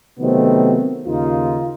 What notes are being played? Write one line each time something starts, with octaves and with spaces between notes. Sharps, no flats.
C3 D#3 F#3 A3 B3 C4
D#2 C#3 D#4 F4